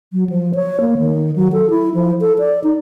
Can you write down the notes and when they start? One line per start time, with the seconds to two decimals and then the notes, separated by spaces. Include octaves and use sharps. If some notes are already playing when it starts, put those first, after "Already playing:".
0.13 F#3
0.30 F3
0.55 C#5
0.80 A#3
0.98 D#3
1.36 F#3
1.53 A4
1.70 E4
1.94 F3
2.21 A4
2.39 D5
2.64 D#4